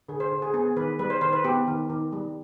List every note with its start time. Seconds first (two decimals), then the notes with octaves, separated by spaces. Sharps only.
0.09 D3 G#4
0.20 C5
0.31 D3
0.42 G#4
0.54 B3 G#4
0.76 D#3 B4
0.99 G3 B4
1.10 C5
1.21 D#3 C5
1.33 B4
1.44 B3 G4
1.67 D#3
1.90 D#3
2.12 G3